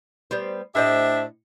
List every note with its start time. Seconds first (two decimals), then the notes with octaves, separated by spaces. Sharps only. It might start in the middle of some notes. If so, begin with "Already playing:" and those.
0.31 G3 B3 C5
0.75 A2 D4 G4 C5 D#5 E5